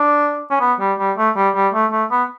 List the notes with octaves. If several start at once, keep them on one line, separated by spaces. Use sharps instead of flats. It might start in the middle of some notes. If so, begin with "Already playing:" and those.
Already playing: D4
C#4
B3
G3
G3
A3
G3
G3
A3
A3
B3